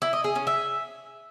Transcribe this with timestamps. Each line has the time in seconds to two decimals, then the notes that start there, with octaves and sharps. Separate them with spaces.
0.02 E4
0.13 D#5
0.24 G#4
0.36 C#4
0.47 E5